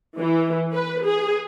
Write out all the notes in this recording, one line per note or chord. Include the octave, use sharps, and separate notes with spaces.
E3
B4
G#4